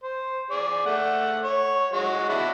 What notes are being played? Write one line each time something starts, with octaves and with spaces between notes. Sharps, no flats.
C5
G#4 D5
A3 F#5
C#5
G#3 F#4 C#5
D4 E4 F#4